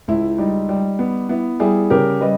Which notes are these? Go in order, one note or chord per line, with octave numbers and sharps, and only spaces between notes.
C#2 E4
G3 D#4
G3
B3
B3 E4
G3 E4 G#4
C#3 G4 A#4
G3 B4 D#5